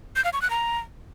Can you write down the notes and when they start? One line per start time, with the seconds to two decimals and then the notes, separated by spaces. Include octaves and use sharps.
0.16 G6
0.24 F5
0.33 C#6
0.42 F#6
0.50 A#5